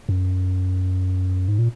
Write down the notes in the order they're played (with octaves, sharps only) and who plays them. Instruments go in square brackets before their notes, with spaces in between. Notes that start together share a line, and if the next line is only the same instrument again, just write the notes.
[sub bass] F#2
G#2
A#2